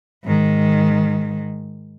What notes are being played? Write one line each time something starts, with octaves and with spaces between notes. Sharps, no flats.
G#2 D#3